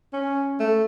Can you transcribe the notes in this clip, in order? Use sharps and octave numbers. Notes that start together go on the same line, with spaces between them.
C#4
A3